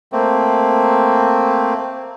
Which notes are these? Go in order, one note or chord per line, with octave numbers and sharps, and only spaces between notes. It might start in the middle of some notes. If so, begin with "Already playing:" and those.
A3 A#3 C4